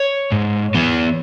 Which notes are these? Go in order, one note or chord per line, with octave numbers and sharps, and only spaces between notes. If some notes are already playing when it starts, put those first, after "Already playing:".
Already playing: C#5
G#2
E3 B3